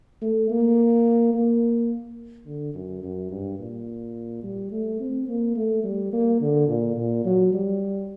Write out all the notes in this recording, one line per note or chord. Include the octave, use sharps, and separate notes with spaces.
A3
A#3
A#3
D3
F#2
F#2
G2
A#2
G3
A3
C4
A#3
A3
G3
A#3
D3
A#2
A#2
F#3
G3